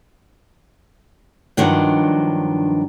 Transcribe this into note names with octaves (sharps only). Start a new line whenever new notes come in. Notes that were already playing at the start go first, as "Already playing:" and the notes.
G2 D#3 F3 F#3 D4